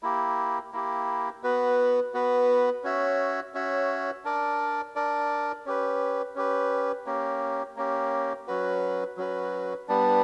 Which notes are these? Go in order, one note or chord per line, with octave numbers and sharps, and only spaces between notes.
A#3 E4 G4
A#3 E4 G4
B3 F#4 B4
B3 F#4 B4
C#4 F#4 C#5 E5
C#4 F#4 C#5 E5
D4 A#4 D5
D4 A#4 D5
C#4 G4 B4
C#4 G4 B4
A#3 C#4 G4
A#3 C#4 G4
F#3 C#4 F#4 B4
F#3 C#4 F#4 B4
G3 B3 D4